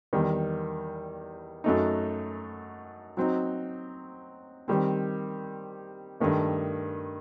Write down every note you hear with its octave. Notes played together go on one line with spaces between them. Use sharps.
E2 D#3 G3
F#2 F#3 A3 D#4
F#3 C4 D#4
D#3 G3 C4
G2 D#3 A3